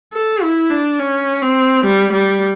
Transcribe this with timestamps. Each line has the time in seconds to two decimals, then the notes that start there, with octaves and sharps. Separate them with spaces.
0.13 A4
0.42 E4
0.70 D4
0.99 C#4
1.42 C4
1.84 G3
2.12 G3